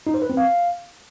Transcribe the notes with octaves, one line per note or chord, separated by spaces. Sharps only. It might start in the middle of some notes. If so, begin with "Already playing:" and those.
D#4
C5
B4
C4
F5